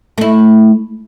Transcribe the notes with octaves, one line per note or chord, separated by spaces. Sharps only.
A3 E4